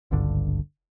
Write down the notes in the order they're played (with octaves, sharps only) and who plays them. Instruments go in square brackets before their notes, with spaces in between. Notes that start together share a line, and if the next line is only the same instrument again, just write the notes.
[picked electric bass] G#1 C#2 G2 D3